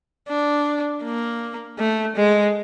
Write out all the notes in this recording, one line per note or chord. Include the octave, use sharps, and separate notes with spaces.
D4
A#3
A3
G#3